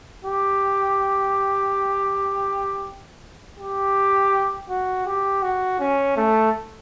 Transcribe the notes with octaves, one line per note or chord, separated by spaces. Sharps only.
G4
G4
F#4
G4
F#4
C#4
A3